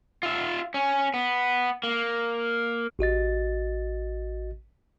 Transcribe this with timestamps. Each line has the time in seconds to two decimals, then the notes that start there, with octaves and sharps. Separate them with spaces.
0.23 F4 E5
0.74 C#4
1.14 B3
1.83 A#3
2.99 A1 F#4 D#5 A6